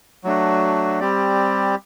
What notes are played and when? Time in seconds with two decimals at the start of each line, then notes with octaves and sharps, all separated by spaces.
0.24 F#3 A3 D4 F#4
1.00 G3 C4 G4 D5